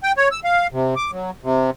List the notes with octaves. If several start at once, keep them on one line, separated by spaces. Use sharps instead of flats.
G5
C#5
E6
F5
C3
D6
F#3
C3